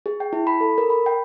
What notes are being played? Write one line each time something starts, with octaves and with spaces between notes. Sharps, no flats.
G#4
G5
E4
B5
A4
A#4
B5
G5